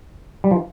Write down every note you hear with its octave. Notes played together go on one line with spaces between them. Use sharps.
G3
F3